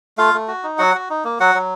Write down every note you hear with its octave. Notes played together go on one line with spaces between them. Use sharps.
A3 F4 F5
A3
F#4
D#4
F#3 F#4 F#5
F#4
D#4
A#3
F#3 F#4 F#5
F#3